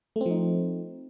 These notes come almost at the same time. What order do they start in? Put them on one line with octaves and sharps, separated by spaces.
A3 C4 F3 D#4